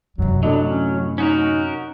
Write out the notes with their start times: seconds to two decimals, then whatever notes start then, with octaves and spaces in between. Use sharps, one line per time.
0.18 F#2 C3 F#3
0.43 A2 F#3 A3 D4 D#5
0.66 C#4
1.18 C#4 D#4 F#4 A#4